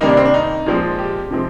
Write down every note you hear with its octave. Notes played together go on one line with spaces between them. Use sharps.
C3 D#3 G3 A#3 D#4
D4
C4
D4
D#4
A#2 F3 G#3 C4
G4
C3 F3 G#3 C4